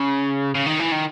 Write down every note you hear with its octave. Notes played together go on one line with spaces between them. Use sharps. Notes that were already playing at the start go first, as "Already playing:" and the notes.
Already playing: C#3
C#3
D#3
E3
D#3